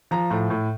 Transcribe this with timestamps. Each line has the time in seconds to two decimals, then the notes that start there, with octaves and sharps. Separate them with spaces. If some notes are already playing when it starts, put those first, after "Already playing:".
0.11 F3 A#5
0.31 A2
0.50 A2